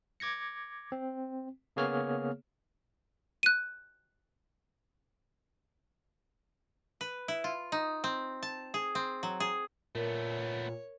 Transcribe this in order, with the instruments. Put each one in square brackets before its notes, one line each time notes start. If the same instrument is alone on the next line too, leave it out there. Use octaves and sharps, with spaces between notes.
[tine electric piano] D6 G#6 A#6 C#7
C4
C#3 A#3 B3 G#4 C#5 F6
[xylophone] F#6 D#7
[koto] B4
E4
F4
D#4
C4
A5
G#4
C4
F#3
G#4
[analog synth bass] A#2 [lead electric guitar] A3 B3 [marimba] A#4 [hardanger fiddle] C#5